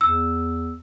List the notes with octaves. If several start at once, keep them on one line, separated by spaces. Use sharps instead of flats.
E2 E6